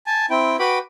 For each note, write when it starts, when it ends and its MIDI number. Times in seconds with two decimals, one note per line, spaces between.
0.07 0.26 80
0.07 0.26 81
0.30 0.57 60
0.30 0.57 64
0.30 0.57 79
0.59 0.79 66
0.59 0.79 71
0.59 0.79 79
0.59 0.79 83
0.59 0.79 86